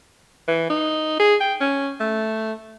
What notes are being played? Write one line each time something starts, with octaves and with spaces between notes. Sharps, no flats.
E3
D#4
G#4
G5
C#4
A3